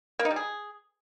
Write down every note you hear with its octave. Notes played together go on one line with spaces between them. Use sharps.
A#3
D#4
G3
G#4